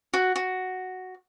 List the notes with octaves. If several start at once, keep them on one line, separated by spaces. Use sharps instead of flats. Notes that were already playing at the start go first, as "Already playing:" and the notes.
F#4
F#4